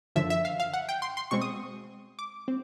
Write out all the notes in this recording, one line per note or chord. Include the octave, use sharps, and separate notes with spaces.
F#2 D3 F3 E5
E5
F5
F5
F#5
G5
C6
C6
B2 G#3 C4 C#6
D#6
D6
C4